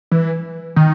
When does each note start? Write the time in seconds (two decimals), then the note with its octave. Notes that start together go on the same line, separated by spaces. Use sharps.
0.11 E3
0.76 D#3